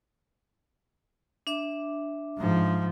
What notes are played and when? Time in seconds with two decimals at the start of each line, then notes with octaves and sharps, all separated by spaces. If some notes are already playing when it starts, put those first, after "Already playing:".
1.47 D4 E5 D6
2.37 G#2 F3